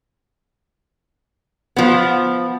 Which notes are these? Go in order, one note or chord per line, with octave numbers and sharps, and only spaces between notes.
F3 B3